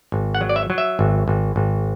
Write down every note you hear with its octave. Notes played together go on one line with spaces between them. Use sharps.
G#1
F#5
F#3
D5
E5
F#3
E5
G#1
G#1
G#1